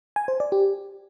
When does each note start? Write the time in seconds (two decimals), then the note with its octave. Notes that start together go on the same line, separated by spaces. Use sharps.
0.16 G#5
0.28 C5
0.40 D5
0.52 G4